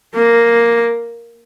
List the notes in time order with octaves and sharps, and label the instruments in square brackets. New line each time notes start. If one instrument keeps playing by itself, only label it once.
[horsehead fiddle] A#3